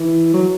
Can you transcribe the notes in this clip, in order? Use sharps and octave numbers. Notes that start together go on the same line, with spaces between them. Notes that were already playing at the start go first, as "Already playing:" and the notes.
Already playing: E3
F#3